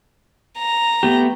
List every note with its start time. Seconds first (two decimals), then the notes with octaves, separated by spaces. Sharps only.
0.58 A#5
1.03 A3 B3 G4